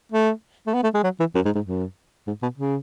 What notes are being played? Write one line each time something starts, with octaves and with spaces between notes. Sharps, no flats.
A3
A3
B3
A3
G#3
F#3
E3
F#2
G#2
G#2
F#2
G#2
B2
C#3